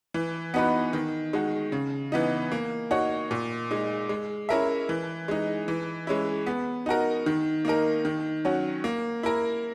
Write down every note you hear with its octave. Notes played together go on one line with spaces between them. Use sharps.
E3
B3 D#4 F#4 B4
D#3
G#3 D#4 F#4
C#3
E3 B3 D#4
A#3
D#4 F#4 C#5
A#2
G#3 D#4
G#3
C#4 E4 A#4 E5
E3
G#3 D#4
E3
G#3 C#4 E4
B3
D#4 F#4 A#4
D#3
A#3 D#4 A#4
D#3
F#3 C#4 F#4
A#3
E4 A#4